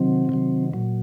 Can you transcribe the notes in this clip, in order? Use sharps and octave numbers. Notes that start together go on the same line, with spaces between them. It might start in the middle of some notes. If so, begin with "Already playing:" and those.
Already playing: C3 D#3 F#3 C4
C3 D#3 F#3
A#2 F#3